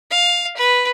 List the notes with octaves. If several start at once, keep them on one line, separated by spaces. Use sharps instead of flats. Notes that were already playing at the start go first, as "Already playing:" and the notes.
F5
B4